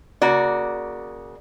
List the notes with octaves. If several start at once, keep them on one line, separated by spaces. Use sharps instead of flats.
C#3 A#3 F#4 D5